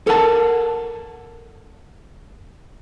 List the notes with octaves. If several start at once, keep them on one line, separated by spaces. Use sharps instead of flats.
A4 A#4 F#5 A5